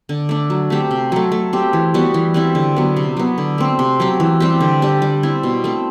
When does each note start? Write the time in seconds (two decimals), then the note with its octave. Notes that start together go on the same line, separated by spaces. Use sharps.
0.09 D3
0.29 A3 D4
0.50 F#3
0.70 A3 C4 G4
0.91 C3
1.12 F#3 A3
1.32 A3
1.53 C4 G4
1.73 E3
1.94 G3 B3 F#4
2.14 E3
2.34 G3 C4 E4
2.55 D3
2.77 F#3 B3
2.96 C3
3.17 F#3 B3
3.38 D3
3.58 A3 C4
3.79 C3
4.00 F#3 C4 G4
4.20 E3
4.40 G3 C4 G4
4.61 D3
4.82 G3 D4 G4
5.02 G3
5.23 C4 E4
5.43 B2
5.64 A3 C4